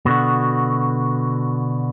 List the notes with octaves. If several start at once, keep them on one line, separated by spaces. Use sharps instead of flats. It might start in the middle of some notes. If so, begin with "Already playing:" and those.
B2 D3 F#4